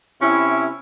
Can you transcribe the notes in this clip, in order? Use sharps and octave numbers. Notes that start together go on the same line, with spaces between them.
C3 C#4 E4